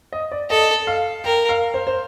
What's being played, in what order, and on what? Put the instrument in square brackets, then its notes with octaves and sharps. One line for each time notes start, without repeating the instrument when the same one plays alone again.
[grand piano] D#5
D5
[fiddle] A4 [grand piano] D#5
[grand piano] F5
[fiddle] A#4 [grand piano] G5
[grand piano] F5
C5
C5